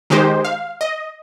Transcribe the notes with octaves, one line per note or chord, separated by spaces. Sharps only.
D#3 G#3 D#4 G4 C5
F5
D#5